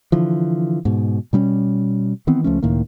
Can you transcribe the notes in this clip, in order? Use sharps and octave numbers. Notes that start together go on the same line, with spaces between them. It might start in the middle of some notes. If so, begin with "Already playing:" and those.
D3 E3 F3
G#2 B2
B2 G3 C4 C#4
D#3 E3 B3 C4
C#2 F3 A3 C#4
C#2 A2 D#3 A#3